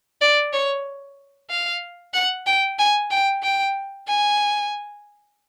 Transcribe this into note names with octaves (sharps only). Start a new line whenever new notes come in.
D5
C#5
F5
F#5
G5
G#5
G5
G5
G#5